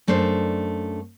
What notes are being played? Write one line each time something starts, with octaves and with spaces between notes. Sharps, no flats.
F#2 A3 D4 C5